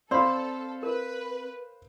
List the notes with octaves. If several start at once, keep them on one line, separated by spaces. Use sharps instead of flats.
C4 A4 C5 D5 F5 B5 C6
A#4 B4